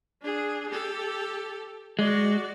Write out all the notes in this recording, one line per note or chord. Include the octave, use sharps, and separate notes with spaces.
D4 G#4
G4 A4
G#3 F#4 D5